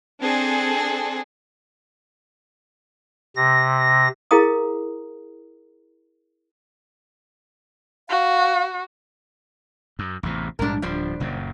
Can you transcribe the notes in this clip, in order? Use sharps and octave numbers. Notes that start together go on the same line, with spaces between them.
C4 D4 G#4 A4
C3 A#6
E4 G#4 A#4 F5 A#5 D#6
F#4 F5
F#2
A1 E2 C3
A#1 G#2 G3 D4 A#4
D1 F3 G3 D4 C5
F#1 A#2 C#3